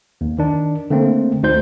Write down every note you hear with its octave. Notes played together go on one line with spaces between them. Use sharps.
D#2
D#3 D4
D3 A3 A#3 C4
D2 D#4 C5 G6